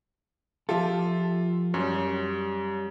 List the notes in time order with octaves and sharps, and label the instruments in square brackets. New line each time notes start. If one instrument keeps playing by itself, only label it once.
[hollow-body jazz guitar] F3 G4 A4 [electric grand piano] F4 E5
[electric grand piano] F#2 [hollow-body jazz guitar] G3 C#5